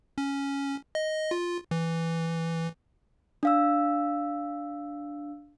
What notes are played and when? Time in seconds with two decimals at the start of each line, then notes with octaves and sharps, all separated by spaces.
0.18 C#4
0.95 D#5
1.31 F4
1.71 E3
3.43 D4 F5 E6